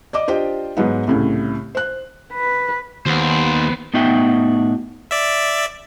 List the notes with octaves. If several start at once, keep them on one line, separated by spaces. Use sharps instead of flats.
D5 D#5 D6
D4 F4 G4 C5 D#5 G5
G#2 F#3 B3 D#4
C2 A2 C#3
C5 F#6
B4
D#2 B3 C5
A2 B3 D#4 F#4 E5 G5
D5 E5